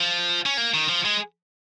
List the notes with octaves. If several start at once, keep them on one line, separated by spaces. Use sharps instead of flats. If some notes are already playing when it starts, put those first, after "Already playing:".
Already playing: F3
C#4
A#3
D#3
F3
G#3